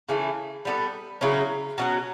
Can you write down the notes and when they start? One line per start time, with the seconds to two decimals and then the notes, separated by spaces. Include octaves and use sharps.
0.09 C#3 E3 A3
0.65 G3 B3 D4 A4
1.21 C#3 F#3 C#4 E4
1.78 B2 F#3 C#4 F#4